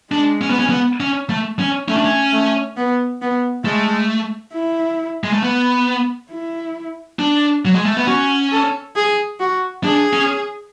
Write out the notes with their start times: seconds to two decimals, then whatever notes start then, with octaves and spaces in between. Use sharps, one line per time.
0.12 G#3 D4
0.41 C#4
0.50 B3
0.59 C#4
0.70 B3
1.00 C#4
1.30 A3
1.59 C#4
1.88 A3 C#4
1.96 D4
2.05 C#4
2.32 A3
2.77 B3
3.22 B3
3.65 G#3 A3
4.53 E4
5.24 G#3
5.33 A3
5.42 B3
6.30 E4
7.19 D4
7.65 F#3
7.75 G#3
7.86 A3
7.97 B3
8.07 C#4 F#4
8.52 A4
8.96 G#4
9.40 F#4
9.84 D4 G#4
10.13 C#4